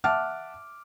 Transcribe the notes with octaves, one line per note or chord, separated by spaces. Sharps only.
E5 F#5 A5 D6 F6